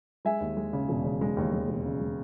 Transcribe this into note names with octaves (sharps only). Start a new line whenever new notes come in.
G#3 E5 G#5
D#2
G#3
C#3
E1
C#3
G#3
D#2
G#3
E1
C#3
G#3